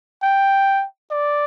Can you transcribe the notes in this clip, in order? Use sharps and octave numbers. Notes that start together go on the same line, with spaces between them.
G5
D5